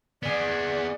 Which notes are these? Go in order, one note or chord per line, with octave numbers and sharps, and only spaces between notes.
B3 G#4 D5